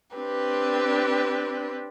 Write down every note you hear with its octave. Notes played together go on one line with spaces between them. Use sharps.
C4 D4 G4 B4